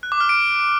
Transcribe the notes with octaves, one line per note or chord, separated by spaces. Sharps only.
F#6
D6
F6
D7